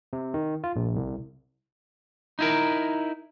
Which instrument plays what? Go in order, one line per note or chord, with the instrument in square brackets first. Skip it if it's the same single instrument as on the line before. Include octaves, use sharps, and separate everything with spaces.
[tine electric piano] C3
D#3
F4
A#1
C2
[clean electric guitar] D#4 E4 A#4